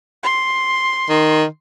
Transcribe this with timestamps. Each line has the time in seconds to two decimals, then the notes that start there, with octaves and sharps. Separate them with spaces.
0.23 C6
1.09 D#3